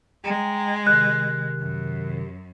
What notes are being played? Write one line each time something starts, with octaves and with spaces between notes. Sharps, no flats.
G#3 G5 A#5
C3 D#3 F#6
F#2